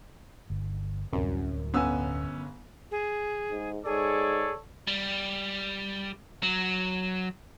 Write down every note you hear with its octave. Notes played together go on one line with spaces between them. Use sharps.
G1
D1 C2 F#2
G1 B3 C#4 G#5 E6
G#4
G#2
G#2 G#4 A4 C#5 D5
G3
F#3